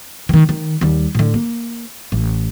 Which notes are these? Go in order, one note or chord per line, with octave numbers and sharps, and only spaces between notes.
D#3 E3
D#3
D#2 G3
A2 D3
A#3
A1